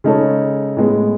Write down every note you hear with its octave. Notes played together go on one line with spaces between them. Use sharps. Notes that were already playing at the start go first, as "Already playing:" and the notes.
C#3 G#3 D#4 A4 C#5
A2 G#3 B3